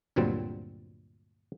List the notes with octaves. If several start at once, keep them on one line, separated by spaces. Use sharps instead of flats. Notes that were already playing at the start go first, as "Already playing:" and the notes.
D2 G2 A#2 F#3 G3 C4